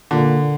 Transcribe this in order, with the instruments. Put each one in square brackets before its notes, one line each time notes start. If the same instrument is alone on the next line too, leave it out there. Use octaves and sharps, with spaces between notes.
[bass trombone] A#2 [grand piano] D3